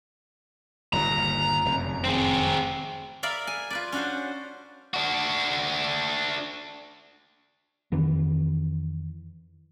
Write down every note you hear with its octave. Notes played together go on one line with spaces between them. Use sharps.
G1 D#2 A#2 A#5
F1 F#2
C4 G#4
A#4 D5 E5 F5 B5
G#5
F4 B4 D5
C#4 D4 F#4 B4 C5
D4 F#4
F2 D#3 E3